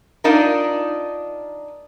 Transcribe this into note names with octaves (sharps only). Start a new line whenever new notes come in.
D4 D#4 F4 A#4